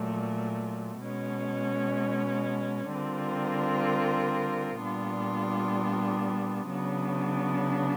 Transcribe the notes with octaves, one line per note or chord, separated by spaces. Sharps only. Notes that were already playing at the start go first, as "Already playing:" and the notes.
Already playing: A#2 F#3 A3
B2 G#3 C#4
D3 G3 C4 F4 A#4
A#2 G3 B3 D4 F4
C#3 F#3 B3 D4